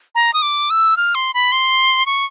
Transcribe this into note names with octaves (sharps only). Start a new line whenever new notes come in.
A#5
D#6
D6
E6
F6
C6
B5
C6
C#6